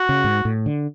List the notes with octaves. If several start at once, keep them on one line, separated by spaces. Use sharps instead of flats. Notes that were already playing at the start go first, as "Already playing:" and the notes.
Already playing: F#4
C#3
G#2
A2
D3